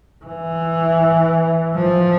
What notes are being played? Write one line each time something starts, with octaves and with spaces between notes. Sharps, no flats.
E3
F3